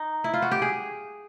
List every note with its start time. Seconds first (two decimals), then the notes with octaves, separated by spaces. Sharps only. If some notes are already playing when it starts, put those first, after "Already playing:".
Already playing: D#4
0.24 E4
0.34 F4
0.42 F#4
0.51 G4
0.62 G#4